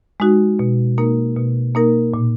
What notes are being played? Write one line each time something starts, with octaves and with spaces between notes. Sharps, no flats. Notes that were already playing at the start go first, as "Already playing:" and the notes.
G#3 D#4 F#4
B2
A#3 D#4 A#4
B2
A#3 D#4 A#4
A#2